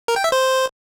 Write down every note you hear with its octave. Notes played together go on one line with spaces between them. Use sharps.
A#4
G5
E5
C5